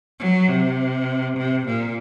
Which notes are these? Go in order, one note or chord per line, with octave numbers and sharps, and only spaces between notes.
F#3
C3
C3
A#2